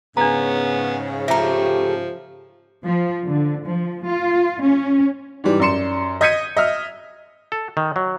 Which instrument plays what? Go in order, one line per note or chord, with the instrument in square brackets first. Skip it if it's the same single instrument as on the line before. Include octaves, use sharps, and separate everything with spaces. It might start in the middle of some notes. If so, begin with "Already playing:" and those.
[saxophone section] G#2 C#3 [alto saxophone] B3 [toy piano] D4 A#5
[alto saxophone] F3 [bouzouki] A3 G4 [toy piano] E5 A#5
[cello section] F3
D3
F3
F4
C#4
[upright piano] G#2 E3 G3
F#2 D5 C6 C#7 E7
D#5 G6 G#6 B6 C#7 D#7
D#5 E5 F6
[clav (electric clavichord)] A4
D#3
F#3